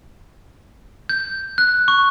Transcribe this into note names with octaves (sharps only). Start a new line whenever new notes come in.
G6
F#6
C#6